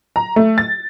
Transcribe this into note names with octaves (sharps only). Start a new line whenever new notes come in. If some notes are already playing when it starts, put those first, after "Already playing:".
A#5
A3
A6